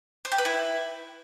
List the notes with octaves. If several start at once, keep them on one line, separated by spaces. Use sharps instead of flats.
C5
G4
B4
E4